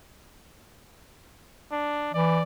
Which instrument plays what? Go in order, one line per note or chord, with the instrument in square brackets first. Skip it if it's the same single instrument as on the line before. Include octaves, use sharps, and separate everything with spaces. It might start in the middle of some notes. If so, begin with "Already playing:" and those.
[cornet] D4
[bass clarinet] E3 [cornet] D5